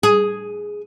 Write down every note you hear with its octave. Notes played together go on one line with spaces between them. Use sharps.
G#4